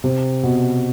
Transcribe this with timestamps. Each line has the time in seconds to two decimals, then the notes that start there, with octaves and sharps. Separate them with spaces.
0.04 C3
0.43 B2